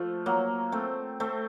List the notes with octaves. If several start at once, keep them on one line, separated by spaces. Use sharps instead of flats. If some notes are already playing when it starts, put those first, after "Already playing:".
Already playing: F3 A3
F#3 A#3
A3 C4
A3 C4